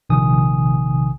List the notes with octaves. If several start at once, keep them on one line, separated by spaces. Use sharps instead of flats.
A#1 C3 D#3 G#5 D#6